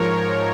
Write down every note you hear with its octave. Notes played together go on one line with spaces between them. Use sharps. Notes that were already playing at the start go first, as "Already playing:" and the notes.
Already playing: G#2 F3 A#4 C#5